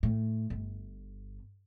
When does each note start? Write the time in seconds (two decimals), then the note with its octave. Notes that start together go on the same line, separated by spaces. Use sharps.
0.03 A2
0.50 G1